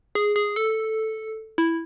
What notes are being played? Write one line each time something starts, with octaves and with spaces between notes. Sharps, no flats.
G#4
G#4
A4
E4